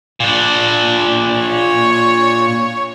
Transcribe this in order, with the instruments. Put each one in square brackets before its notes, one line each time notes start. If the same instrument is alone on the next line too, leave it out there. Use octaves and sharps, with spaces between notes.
[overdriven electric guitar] A#2 D4
[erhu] C#5